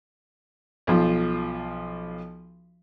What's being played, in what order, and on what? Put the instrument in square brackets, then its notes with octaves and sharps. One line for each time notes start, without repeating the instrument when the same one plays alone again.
[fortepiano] B1 F3 F4